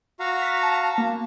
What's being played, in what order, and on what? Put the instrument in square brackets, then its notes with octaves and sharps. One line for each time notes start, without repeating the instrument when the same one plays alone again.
[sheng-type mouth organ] F#4 F5 A#5
[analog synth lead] B6
A5
A#3